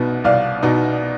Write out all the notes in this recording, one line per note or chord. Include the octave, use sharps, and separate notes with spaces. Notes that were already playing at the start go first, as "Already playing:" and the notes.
Already playing: C2 B2 B3 D#4
C2 D5 F5
B2 B3 D#4